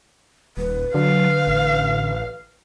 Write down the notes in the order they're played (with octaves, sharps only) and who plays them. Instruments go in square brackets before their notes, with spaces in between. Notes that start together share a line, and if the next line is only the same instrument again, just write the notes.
[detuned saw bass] D#1 [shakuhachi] B4
[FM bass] D3 [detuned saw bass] F#3 [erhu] F5
[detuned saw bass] A1